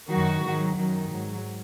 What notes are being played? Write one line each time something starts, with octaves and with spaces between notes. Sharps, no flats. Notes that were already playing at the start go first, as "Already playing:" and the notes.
F#2 D#3 F#3 F#4
G#2 D#3 F#3
F#2 D#3 F#3
G#2 F#3